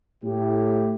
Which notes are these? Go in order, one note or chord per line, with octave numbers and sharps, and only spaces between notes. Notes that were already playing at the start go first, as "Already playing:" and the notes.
A2 G4